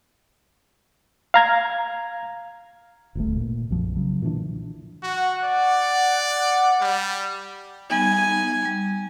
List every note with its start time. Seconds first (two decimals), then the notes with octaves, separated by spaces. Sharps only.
1.34 F5 A#5 G#6
3.15 D#1 G#1 D2 A3
3.36 A#2
3.70 B1 F#2 F3
3.96 C#3 F#3
4.22 A#2 D3 E3 D4
5.03 F#4 F#5
5.44 D5
6.81 G3
7.90 G3 B3 D#4 G#5
8.65 G3